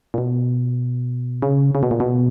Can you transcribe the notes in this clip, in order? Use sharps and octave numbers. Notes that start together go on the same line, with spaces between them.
A#2
B2
C#3
C#3
B2
A#2
B2